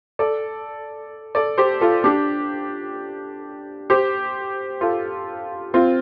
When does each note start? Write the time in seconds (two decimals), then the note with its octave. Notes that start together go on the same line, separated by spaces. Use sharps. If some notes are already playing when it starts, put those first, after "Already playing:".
0.19 A4 D5
1.35 A4 D5
1.58 G4 C5
1.81 F4 A4
2.04 D4 G4
3.90 G4 C5
4.81 F4 A4
5.74 C4 F4